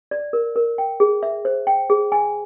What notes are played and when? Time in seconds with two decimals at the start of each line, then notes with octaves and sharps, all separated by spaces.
0.11 D5
0.33 A#4
0.56 A#4
0.78 G5
1.00 G#4
1.23 E5
1.45 C5
1.67 G5
1.90 G#4
2.12 G#5